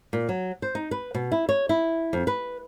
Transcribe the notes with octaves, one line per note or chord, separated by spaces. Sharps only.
A#2
F#3
C5
D#4
B4
B2
E4
C#5
E4
F2
B4